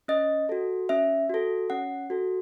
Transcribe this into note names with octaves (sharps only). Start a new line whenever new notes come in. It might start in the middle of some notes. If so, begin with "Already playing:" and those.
C#4 D#5
F#4 A4
C#4 E5
F#4 A4
C#4 F#5
F#4 A4